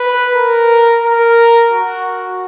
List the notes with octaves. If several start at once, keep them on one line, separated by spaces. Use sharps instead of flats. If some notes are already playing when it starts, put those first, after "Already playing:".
Already playing: B4
A#4
A#4
F#4